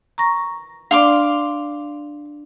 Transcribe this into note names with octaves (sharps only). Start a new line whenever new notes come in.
A#5 C#6 A#6
D4 D5 F5 C6 D6